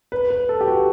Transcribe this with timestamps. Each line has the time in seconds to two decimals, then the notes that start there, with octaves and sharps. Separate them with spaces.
0.12 B4
0.30 B4
0.49 A4
0.61 G4
0.68 F#4